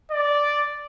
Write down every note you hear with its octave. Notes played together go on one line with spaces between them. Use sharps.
D5